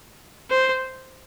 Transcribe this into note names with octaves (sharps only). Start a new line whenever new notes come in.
C5